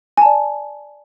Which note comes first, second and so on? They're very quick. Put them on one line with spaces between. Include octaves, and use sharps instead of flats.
G#5 A5 D5